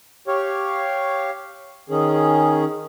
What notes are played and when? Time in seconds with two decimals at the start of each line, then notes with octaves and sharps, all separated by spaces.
0.28 G4 C#5 F5
1.89 D#3 C#4 G#4